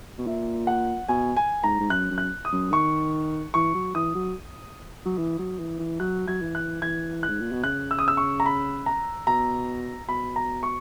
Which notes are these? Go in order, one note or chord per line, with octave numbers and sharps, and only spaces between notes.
B2
A#2 E5
F#5
B2 G#5
G#5
G#2 A#5
G#2
F#2 F#6
F#2
F#6
D#6
F#2
D#3 C#6
E3 C#6
F#3
E3 D#6
F#3
F#3
E3
F#3
E3
E3
F#3 F#6
F#3 G#6
E3
F#6
E3 G#6
F#6
G#2
A#2
B2
C#3 F#6
E6
D#6
E6
C#6
A#5
B5
A#5
B2 A#5
B2 B5
A#5
C#6